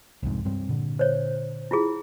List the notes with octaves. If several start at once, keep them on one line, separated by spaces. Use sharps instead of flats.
C2 F2 G#2
G2 G3 C4
A#2 D3
C5 C#5
E4 F4 G#4